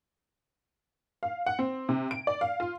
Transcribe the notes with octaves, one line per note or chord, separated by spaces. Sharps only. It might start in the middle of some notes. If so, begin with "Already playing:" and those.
F5
F#5
C4
C3
D7
D5
F5
F4